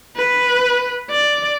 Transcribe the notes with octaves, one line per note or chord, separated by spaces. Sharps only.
B4
D5